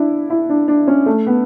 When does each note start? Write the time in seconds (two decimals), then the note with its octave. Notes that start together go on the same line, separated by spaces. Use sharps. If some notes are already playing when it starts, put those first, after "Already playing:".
Already playing: D4 E4
0.30 E4
0.49 D4
0.68 D4
0.87 C#4
1.06 A3
1.26 B3